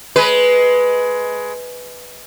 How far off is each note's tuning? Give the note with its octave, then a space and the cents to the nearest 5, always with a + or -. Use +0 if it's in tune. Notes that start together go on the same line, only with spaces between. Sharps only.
G#3 +15 B4 +0